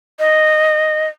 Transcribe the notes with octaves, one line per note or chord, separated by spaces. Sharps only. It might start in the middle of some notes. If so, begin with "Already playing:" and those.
D#5